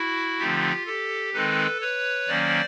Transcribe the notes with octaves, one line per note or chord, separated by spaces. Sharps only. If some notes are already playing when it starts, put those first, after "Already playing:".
Already playing: E4 F#4
D3 F3 A3 C4 D#4 F4 G4
G4 A4
D#3 G#3 C4 D#4 A4 B4
B4 C#5
D#3 F#3 A#3 C#4 C5 D5